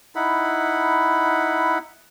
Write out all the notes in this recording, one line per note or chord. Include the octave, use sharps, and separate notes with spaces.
D#4 E4 F#5 B5